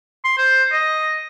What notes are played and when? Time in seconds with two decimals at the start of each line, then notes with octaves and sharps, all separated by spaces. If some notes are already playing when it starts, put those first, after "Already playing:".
0.24 C6
0.38 C5
0.72 D#5